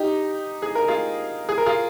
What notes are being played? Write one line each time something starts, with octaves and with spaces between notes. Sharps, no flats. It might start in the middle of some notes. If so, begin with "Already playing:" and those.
Already playing: D#4 G4
G#4
A#4
F4 G#4
G#4
A#4
F4 G#4